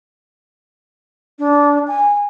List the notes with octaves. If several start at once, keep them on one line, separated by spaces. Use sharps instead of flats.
D4
G#5